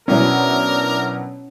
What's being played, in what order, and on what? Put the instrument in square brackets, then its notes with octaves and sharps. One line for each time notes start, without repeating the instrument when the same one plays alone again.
[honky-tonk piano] B2 F#3 E4 [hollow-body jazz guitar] C#4 [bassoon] D4 [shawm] A#4